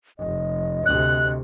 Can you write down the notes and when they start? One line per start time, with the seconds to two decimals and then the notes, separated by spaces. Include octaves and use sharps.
0.19 F1 D#5
0.86 D2 C3 F#6